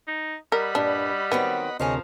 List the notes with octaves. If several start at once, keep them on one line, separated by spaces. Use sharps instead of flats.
D#4
G3 A#4 D#5 F#5 B5
G2 A#2 D4
D#3 F#3 B3 C4
D2 C3 F3 G#4 A#4 C#5 D#5